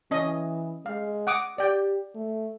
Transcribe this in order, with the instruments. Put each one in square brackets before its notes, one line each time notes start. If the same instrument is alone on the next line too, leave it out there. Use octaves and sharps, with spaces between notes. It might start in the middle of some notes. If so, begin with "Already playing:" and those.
[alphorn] E3 [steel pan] C#4 D#5
[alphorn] G#3 [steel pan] F5
[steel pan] F#5 D6 D#6
[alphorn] G4 [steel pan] D5 G5
[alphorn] A3